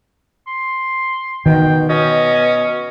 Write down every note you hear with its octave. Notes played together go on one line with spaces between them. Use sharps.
C6
B2 D#3 G5
B2 C#4 D#5